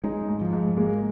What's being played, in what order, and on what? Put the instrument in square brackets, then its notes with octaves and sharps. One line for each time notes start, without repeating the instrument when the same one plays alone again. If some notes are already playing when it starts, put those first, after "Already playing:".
[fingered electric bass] G#3 [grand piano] D#4
[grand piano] G#2
[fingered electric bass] F3
[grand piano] G#2
[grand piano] G#3 [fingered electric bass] A#3